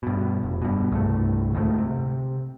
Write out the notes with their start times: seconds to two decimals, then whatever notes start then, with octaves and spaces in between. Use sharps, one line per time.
0.03 G2 B2
0.43 F1
0.62 G2 B2
0.92 C2 G2 A3
1.53 F#1 D2 G#2 A3
1.78 C3